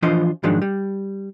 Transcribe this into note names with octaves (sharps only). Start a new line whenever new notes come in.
E3 F3 D4 F4 C5 D#5
G#2 D#3 F3 F#3 G#3 D4
G3